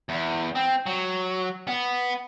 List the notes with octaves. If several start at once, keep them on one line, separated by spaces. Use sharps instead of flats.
E2
C4
F#3
B3